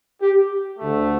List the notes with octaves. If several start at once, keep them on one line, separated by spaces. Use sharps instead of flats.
G4
D2 D3 A3